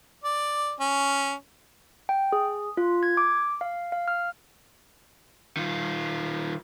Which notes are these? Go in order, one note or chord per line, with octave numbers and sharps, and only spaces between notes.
D5
C#4
G5
G#4
F4
G#6
D6
F5
F5
F6
D#3 F4